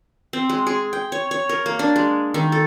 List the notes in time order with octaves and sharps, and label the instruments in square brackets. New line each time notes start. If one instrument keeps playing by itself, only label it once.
[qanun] C4
G#3
G#4
G5
C#5
C#5
A#4
A#3
D4
G#3
D#3
A4